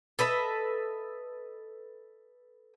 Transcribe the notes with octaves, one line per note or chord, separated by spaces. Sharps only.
A4 B4 D#5 E5